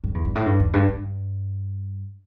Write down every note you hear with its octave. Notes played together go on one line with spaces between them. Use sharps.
G2
E2
G2
A2
G2
E2
G2
G2